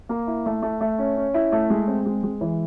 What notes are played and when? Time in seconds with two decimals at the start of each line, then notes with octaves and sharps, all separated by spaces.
0.09 A#3
0.27 E4
0.46 A3
0.62 A3
0.81 A3
0.98 C#4
1.17 C#4
1.34 E4
1.52 A3
1.70 G#3
1.87 C4
2.06 G#3
2.23 G#3
2.41 E3